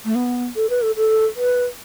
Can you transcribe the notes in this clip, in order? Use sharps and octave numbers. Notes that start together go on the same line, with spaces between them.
A3
B3
A4
B4
A4
A4
B4